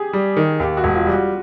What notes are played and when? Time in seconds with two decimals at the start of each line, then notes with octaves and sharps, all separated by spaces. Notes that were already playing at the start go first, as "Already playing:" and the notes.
Already playing: G4 G#4
0.13 G3
0.37 D#3
0.60 D#2 G4
0.77 F#4
0.84 E1
0.96 F4
1.07 G3
1.13 F#4